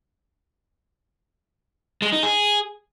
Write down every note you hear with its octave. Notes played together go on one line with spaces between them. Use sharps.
G#3
D#4
G#4